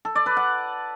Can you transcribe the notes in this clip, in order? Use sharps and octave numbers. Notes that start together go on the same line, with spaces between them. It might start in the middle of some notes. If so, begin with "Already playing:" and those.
A4
D5
B4
F#5